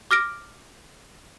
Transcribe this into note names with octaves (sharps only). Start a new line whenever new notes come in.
D6 F6 A#6 D7